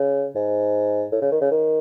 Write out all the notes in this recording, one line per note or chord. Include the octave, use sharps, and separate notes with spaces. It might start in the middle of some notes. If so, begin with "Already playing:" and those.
Already playing: C#3
G#2
A2
C#3
D#3
C#3
D#3